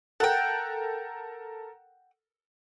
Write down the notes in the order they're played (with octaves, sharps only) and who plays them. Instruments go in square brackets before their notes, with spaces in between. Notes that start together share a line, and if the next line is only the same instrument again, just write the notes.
[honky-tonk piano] A4 A#4 [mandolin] F#5 G5